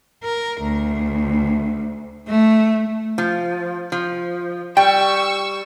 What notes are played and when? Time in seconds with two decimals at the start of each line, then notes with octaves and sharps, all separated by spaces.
0.24 A#4
0.61 D2
2.28 A3
3.18 F3
3.92 F3
4.77 G3 G5 C#6 E6